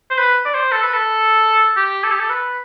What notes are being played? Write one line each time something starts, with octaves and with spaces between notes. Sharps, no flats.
C5
B4
D5
C5
A4
B4
A4
G4
A4
G4
A4
B4